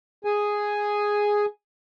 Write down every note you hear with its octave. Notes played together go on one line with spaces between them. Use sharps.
G#4 G#5